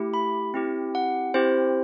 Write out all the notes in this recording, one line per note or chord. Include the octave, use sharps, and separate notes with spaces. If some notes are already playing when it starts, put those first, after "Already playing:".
Already playing: A3 E4 G4
B5
C4 E4 G4
F#5
C4 E4 G4 C5